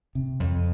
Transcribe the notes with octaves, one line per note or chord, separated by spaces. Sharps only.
C3
F2